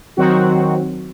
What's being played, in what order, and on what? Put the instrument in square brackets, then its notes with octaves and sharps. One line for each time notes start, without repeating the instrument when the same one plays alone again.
[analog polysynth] D#3 F#3 C4 F#4